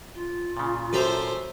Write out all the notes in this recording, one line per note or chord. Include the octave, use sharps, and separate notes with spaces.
F4
A#2 C#3
F#2 A4 C5 E5 A#5